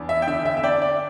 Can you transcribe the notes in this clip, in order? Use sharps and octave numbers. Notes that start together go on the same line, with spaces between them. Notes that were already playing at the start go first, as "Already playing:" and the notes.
Already playing: E2 D4
E5
G5
D3 E5
E5
E5
D4 D5 G5
D5